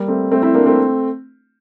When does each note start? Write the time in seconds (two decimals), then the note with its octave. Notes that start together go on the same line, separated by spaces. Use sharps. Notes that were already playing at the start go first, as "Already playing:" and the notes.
Already playing: G3 A#3
0.08 A3 C4
0.31 A3 C4
0.43 C4 E4
0.54 A#3 D4
0.66 A3 C4